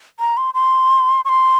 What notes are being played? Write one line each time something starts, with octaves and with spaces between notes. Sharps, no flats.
A#5
C6
C6
C#6
C6